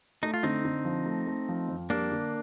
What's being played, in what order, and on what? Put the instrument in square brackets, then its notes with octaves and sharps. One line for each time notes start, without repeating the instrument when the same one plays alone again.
[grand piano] A3 [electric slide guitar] D#4
[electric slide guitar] F4
[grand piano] D3 [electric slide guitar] C4 D#4
[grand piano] D3
F3
A3
A3
F3
F2
[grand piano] G3 [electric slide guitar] A#3 D4
[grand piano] D3